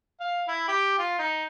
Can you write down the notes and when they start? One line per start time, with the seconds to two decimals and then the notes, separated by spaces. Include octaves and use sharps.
0.20 F5
0.48 E4
0.68 G4
0.99 F4
1.19 D#4